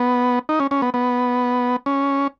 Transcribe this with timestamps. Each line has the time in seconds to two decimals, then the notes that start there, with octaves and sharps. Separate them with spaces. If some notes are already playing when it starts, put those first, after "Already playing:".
Already playing: B3
0.49 D#4
0.60 C#4
0.71 C#4
0.82 B3
0.94 B3
1.86 C#4